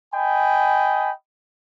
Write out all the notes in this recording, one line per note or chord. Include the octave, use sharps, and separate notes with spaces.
D#5 G5 G#5 B5